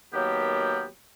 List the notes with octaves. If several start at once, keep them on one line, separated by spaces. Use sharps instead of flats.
D#3 F#3 A#3 B3 G4